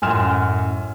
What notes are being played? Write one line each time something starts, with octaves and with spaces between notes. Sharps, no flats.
A1 F#2 G#5 C6 F6 E7